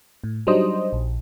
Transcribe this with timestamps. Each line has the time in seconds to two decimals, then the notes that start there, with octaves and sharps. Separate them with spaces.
0.24 A2
0.47 F#3 G3 D4 D#4 C5 D#5
0.93 A#1